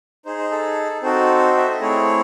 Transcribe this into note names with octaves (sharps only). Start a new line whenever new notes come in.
D#4 G#4 C5
C5
A4
C4 D#4 F#4 A4 C5
E5
D#5
A3 C4 E4 G#4 C#5